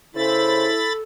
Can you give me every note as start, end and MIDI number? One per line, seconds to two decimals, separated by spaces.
0.15 0.69 49
0.15 0.88 64
0.15 1.02 69
0.15 0.69 72
0.15 0.93 83
0.15 0.93 93